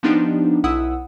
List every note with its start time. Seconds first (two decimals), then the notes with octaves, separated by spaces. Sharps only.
0.03 F3 B3 D4 D#4 G4
0.64 B1 E4 F#5 D#6 E6